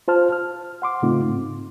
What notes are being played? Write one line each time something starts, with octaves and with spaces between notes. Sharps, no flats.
F4 C5 A5 F6
F6
F#5 C6 D6
A2 C#3 A3 C4 D#4 F4
G#2